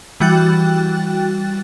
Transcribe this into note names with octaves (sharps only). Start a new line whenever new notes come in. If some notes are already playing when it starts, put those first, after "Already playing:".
E3 G3 F#4 G5 F#6 A6